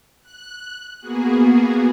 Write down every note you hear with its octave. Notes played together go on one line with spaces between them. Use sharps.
F#6
A#3 B3 F#4 G#4